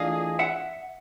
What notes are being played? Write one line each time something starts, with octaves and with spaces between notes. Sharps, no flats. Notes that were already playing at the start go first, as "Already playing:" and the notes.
Already playing: E3 A3 D4 F4 G#4 D#5 F5
E5 F#5